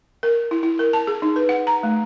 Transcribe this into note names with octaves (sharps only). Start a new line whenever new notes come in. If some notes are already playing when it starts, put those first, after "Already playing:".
A#4
E4
E4
A#4
A5
G#4
D#4
B4
F#5
A#5
A3